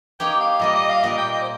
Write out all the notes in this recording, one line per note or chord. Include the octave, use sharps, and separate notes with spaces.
A#3 D#4 G4 C#5 G5
F5
A#2 G3 A#3 D#5
D#5
F5
A#2 G3 A#3 D#5
G5
D#5
C5